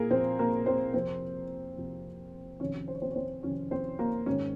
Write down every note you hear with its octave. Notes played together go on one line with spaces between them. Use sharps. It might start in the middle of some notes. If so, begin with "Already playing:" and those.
Already playing: A#2 A#3 G#4 A#4
A#2 F3 C4 C5
A#3 A#4
C4 C5
F2 C3 F3 C4 C5
F2 C3 F3
F2 C3 D#3 C#4 C#5
C5
C#5
C4 C5
C#5
C4 C5
F2 C3 D#3 C#4 C#5
C4 C5
A#3 A#4
G#2 D#3 C#4 C#5